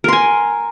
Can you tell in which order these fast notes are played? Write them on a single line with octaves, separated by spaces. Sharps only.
A#4 C6 G#5